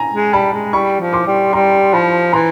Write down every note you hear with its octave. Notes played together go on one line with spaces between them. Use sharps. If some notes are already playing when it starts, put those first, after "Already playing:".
Already playing: G#5 A#5
G#3
G3 A5 B5
G#3
G3 B5 C#6
F3
C6 D6
G3
G3 A#5 C6
F3 A5 B5
E3 A#5 C6